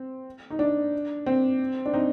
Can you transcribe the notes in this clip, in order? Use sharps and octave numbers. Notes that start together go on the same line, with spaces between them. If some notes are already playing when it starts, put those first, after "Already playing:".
Already playing: C4
D#4
D4
C4
D4
C4 D#4